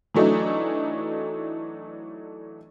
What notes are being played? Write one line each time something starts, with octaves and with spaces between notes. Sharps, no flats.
E3 F#3 A3 D4 D#4